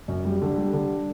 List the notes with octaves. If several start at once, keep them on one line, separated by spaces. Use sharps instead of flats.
F#2
G3
D3
G3
D3